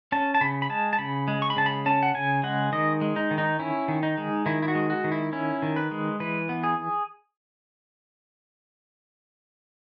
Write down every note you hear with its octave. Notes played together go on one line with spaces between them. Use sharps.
C#4 A5
A5
C#3 B5
B5
G#3 A5
A5
C#3 B5
G#3
C#6
B5
C#3 A5
B5
C#4 A5
F#5
C#3 G#5
G#3 F#5
D#3 D#5
G#3
D#4
D#3
D#4
C#4 E4
D#3
D#4
G#3
D#3 E4
E4
F#4
G#3
F#4
D#3
E4
C#4 E4
D#3
B4
G#3
E3 B4
B3
G#4